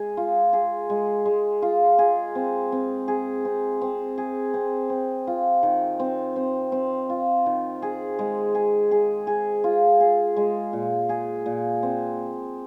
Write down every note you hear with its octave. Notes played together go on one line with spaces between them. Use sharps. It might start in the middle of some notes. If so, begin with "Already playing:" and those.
Already playing: G#3 G#4
F4
G#4
G#3
G#3
F4
G#4
C4
C4
G#4
C4
C4
G#4
C4
C4
F4
D#3
C4
C4
C4
F4
D#3
G#4
G#3
G#4
G#4
G#4
F4
G#4
G#3
A#2
G#4
A#2
C4